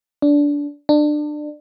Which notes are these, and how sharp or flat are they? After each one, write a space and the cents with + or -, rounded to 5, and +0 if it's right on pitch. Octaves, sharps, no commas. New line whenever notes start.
D4 -20
D4 +25